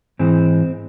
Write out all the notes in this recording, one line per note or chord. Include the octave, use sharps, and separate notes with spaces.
G#2 E3 G#3 C4